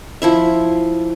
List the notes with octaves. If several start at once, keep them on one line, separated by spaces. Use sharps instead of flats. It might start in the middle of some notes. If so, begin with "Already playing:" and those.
F3 E4 E5